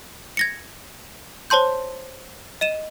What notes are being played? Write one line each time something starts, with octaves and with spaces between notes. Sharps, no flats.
G#6 A#6 C#7
C5 C#5 A5 C6 G6
D#5 D#7 E7